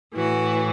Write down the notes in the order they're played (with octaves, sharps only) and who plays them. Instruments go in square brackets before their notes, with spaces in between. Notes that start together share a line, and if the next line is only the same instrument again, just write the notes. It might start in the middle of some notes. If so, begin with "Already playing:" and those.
[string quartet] A2 E3 F#4